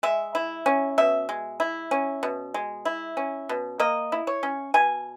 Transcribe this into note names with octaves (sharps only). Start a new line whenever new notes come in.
G#3 E5
E4
C#4
B2 E5
G#3
E4
C#4
B2
G#3
E4
C#4
B2
A#3 D#5
E4
C#5
C#4
B2 G#5